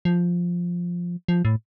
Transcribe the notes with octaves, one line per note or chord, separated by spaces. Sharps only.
F3
F3
A2